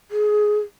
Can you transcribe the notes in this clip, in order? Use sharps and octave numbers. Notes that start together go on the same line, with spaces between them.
G#4